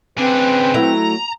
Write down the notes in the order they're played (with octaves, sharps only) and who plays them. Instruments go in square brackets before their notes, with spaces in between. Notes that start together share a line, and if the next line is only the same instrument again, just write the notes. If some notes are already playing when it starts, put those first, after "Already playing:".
[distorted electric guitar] C#3 D4 [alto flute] C4 [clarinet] B4
[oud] F#3 A3 E4 [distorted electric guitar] A#5